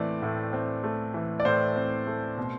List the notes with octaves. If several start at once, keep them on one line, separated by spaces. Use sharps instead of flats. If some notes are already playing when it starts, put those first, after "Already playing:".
Already playing: A2 E3 A3 C4 D5
A2
C4
A3
E3
D5
A2 C5
C4
A3
B2